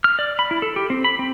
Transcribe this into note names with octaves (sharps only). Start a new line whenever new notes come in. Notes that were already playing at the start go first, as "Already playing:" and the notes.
F6
D5
B5
E4
A4
G4
C4
B5
C4